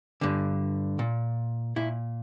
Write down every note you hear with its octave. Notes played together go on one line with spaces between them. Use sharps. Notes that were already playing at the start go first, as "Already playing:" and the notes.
G2 D3
A#2
A#2 E4